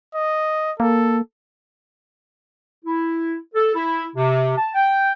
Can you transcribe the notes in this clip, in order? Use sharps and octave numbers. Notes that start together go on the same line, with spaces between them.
D#5
A#3 A4
E4
A4
E4
C3
A5
G5